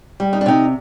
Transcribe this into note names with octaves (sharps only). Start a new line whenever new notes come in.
G3
D#4
D4
C3 D#4